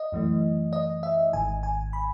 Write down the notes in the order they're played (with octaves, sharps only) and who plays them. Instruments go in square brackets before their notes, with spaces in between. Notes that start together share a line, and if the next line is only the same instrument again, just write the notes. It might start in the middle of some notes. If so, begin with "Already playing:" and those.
Already playing: [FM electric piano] D#5
F#2 E3 A3
D#5
E5
G#1 G#2 D#3 G#5
G#5
B5